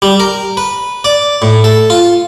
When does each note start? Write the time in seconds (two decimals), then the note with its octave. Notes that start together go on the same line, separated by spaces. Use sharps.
0.02 G3
0.20 A#4
0.57 B4
1.04 D5
1.42 A2
1.64 A4
1.90 F4